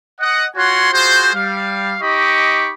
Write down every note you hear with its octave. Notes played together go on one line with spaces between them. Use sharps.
D#5 F#5
F4 F#4 C#5 F#5 G#5 C6
F4 F#4 G#4 C5
G3 F5
D#4 G4 D#5 B5 C#6 D6